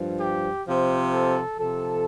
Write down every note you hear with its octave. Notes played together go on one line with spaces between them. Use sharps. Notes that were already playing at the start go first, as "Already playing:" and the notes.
Already playing: G2 F3
G4
C3 F3
A4
C3 F3 A4